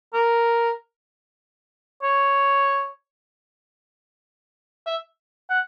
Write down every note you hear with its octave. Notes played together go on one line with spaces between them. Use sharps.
A#4
C#5
E5
F#5